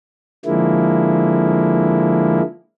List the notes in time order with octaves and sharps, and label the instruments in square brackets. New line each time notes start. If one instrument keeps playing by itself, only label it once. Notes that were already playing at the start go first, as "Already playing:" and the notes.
[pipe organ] D3 F3 G#3 A#3 E4